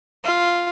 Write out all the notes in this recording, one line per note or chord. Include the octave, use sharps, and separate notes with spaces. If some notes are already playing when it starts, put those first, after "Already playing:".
F4